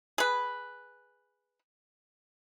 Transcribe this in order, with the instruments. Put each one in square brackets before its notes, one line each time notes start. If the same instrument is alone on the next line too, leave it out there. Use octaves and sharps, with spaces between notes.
[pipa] G#4 B4